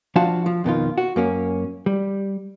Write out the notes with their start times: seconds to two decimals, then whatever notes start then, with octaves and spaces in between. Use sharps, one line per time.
0.16 F3 D4 F4 F#4 F5 A5
0.46 F3
0.64 F2 B2 D#3 F4
0.98 F#4
1.16 F#2 A#3 C#4
1.86 G3